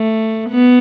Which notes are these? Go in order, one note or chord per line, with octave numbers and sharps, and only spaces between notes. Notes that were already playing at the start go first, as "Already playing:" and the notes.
Already playing: A3
B3